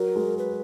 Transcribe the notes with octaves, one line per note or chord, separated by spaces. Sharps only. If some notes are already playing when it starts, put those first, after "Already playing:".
Already playing: F#3 A#4
G#3
B4